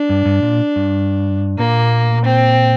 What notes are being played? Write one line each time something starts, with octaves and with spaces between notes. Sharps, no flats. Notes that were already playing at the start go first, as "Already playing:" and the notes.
Already playing: D4
G2
G2
A#2
G2
A#2 A#3
C4